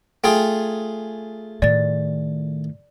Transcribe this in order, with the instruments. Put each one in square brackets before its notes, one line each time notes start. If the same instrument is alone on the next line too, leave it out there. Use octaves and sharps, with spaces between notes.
[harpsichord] A3 F4 G#4 [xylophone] G5
[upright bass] A2 D#3 [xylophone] D5 A6